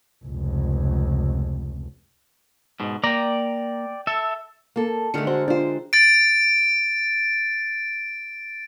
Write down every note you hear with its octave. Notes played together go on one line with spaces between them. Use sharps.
F1 C#2
G#2 B2
A#3 D5 G5 A#5
A4 E5
A#3 A4
D3 D#3 G#3 A3 A#4 C#7
F#4 C5
D4 F4 G4 C5
A6 D7